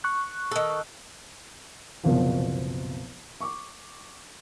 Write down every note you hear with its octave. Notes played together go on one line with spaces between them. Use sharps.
C#6 F#6
D#3 A4
F#1 C2 B2 F3
C#6 D6